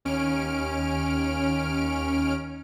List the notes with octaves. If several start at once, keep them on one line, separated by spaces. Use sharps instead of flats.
D#2 C#4 F6 D7